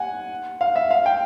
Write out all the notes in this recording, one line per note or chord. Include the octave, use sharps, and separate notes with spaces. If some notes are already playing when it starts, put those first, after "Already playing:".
Already playing: F#5 G#5
F5
E5
F5
G5